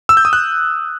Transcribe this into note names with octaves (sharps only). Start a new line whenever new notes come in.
E6
G6
D#6
F#6